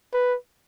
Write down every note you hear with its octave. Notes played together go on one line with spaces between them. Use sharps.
B4